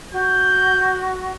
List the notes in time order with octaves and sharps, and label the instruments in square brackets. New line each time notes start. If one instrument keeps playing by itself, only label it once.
[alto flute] F#4 [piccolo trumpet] G6